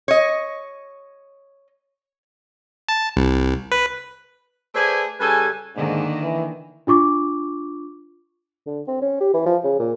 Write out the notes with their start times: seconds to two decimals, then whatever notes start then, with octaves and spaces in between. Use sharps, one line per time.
0.08 C#5 D#5
2.89 A5
3.17 C2
3.72 B4
4.75 A3 G#4 B4 C5 D5 G#5
5.20 C#3 G3 A4 B4 G#5
5.76 G#2 D3 D#3 A#3
6.22 E3
6.87 D4 F4 C#6 D6
8.66 D3
8.88 C4
9.02 C#4
9.21 G4
9.34 E3
9.46 F3
9.63 C#3
9.79 A#2